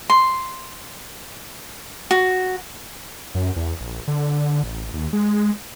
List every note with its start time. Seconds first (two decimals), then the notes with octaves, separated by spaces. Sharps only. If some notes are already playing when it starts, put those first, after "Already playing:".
0.10 C6
2.11 F#4
3.35 F#2
3.56 E2
3.81 A#1
4.08 D3
4.64 A1
4.93 D#2
5.13 G#3